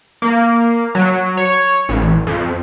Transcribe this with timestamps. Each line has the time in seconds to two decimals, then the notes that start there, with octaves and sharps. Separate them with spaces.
0.22 A#3
0.95 F#3
1.37 C#5
1.89 A1
2.27 F2